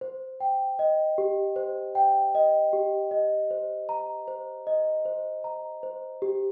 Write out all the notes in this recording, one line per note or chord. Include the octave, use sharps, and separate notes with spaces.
C5
G5
D#5
G4
C5
G5
D#5
G4
D#5
C5
A#5
C5
D#5
C5
A#5
C5
G4